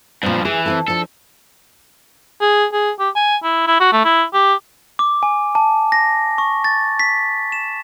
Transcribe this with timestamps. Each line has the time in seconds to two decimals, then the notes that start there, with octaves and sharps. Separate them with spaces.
0.23 G2 A#2 F3 C4
0.45 E3 G#4
0.66 C4 E4 A4
0.88 F3 D4 A4
2.41 G#4
2.73 G#4
3.00 G4
3.15 G#5
3.44 E4
3.67 E4
3.80 F#4
3.92 A3
4.05 E4
4.34 G4
4.99 D6
5.23 G#5
5.55 A5
5.92 A#6
6.38 C#6
6.64 A6
6.99 B6
7.52 E7